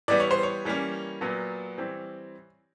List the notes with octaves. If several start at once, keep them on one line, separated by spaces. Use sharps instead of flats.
E3 G3 B3 D5
C#5
C5
C#5
E3 G3 A#3 C#4
A#2 F#3 B3
E3 G3 C4